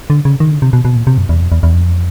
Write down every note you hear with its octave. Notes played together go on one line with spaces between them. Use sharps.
D3
C#3
D#3
D3
C3
B2
B2
A#2
C3
F#2
E2
F2
E2
E2
F2